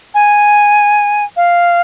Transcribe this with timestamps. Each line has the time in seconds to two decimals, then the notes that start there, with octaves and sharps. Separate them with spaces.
0.14 G#5
1.37 F5